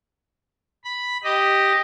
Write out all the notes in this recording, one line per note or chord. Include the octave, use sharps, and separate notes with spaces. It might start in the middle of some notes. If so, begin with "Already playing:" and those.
B5
G4 D#5